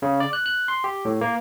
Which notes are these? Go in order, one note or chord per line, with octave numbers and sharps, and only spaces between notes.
C#3
D5
F#6
F#6
C6
G4
A2
A#3